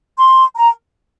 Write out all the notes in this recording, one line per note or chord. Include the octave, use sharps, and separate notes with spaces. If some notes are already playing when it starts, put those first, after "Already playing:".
C6
A#5